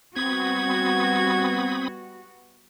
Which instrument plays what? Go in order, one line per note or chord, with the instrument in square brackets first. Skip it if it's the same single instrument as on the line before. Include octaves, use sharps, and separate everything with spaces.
[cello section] G3 B3 F#4 [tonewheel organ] C4 B5 D#6 [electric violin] G#6